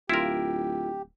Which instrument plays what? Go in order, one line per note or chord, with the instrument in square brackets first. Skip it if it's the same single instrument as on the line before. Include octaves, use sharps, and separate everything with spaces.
[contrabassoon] D1 [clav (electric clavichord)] E4 A#4 [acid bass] F4 [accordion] G4